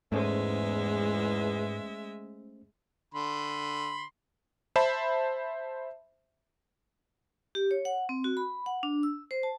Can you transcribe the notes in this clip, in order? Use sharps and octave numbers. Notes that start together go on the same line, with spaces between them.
E2 G#2 G#3 A3 C#4 C5 E5
D3 B5 C6
C5 E5 A5 B5
G4
C#5
F#5
C4
F#4
B5
F#5
D4
E6
C5
A5